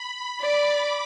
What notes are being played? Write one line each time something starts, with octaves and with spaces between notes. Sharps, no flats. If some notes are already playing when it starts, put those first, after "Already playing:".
Already playing: B5
D5 D6